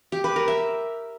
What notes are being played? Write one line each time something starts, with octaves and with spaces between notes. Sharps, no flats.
G4
B4
A#4
E5